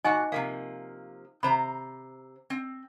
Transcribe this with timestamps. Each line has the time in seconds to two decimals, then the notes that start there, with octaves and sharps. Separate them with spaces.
0.05 A#2 D#4 F#4 D#5 F#5 G#5
0.32 C3 F3 A#3 F5
1.43 C3 C5 A#5 B5
2.50 C4